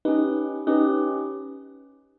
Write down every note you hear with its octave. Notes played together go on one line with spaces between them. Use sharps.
C#4 D#4 G4 B4
C#4 D#4 G4 B4